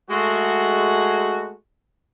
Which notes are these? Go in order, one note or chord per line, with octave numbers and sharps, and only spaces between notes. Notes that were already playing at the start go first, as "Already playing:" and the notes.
G#3 A3 F#4